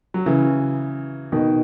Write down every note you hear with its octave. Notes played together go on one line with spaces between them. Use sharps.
F#3
C#3 E3
B2 D#3